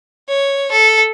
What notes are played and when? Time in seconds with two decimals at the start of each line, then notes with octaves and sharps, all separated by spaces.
0.29 C#5
0.72 A4